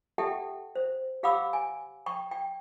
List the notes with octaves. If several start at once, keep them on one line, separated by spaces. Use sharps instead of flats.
G4 A4 E5 F#5 G5 A5
C5
G4 F5 F#5 B5 D6 E6
G#5
G5 C#6
G5